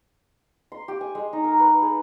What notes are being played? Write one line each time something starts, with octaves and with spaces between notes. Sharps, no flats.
C6
G4
G#5
G#3
D#4
A#4
B4
G#4